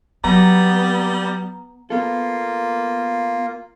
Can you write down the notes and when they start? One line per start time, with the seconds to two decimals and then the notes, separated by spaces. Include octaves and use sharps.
0.24 F#3 G3 B3 A#5
1.90 A#3 B3 F4 A4